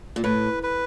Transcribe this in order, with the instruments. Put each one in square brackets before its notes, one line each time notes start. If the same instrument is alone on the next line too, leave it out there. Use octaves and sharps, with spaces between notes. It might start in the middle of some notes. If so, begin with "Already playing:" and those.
[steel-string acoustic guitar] A#2
[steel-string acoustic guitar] A2 [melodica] B4
[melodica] B4